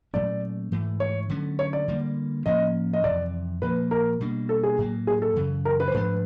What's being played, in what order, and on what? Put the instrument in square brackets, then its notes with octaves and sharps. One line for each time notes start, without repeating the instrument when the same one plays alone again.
[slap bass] A#2 F#3 A3 C#4 [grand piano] D5
[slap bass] G#2 E3 A3
[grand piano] C#5
[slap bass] D3 F#3 A3 C#4
[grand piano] C#5
D5
[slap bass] D3 G3 A#3
[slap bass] A2 F3 A#3 C#4 [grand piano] D#5
[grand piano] D#5
[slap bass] F2 C3 E3 [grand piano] D5
[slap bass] A#2 F3 A#3 [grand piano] B4
[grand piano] A#4
[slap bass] B2 G3 A#3 D4
[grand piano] A4
G#4
[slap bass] A2 F#3 A#3
[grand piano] G#4
A4
[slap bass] F#2 C#3 E3
[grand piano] A#4
B4
C5
[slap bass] G#2 F3 A3 D4 [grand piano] B4